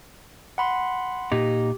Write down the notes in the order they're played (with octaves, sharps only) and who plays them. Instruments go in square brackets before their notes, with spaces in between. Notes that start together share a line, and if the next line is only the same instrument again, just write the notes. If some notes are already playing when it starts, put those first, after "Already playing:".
[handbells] F#5 B5 C6
[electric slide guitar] A#2 D#4 [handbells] G4